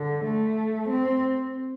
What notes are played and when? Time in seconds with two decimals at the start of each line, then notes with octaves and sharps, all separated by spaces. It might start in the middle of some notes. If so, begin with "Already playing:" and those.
Already playing: D3
0.25 A3
0.89 C4